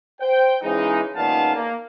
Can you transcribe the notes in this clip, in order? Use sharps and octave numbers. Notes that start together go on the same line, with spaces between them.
C5 G5
C#3 E3 G#3 D#4
C#2 A#2 D#3 B3 F5 A5
A#3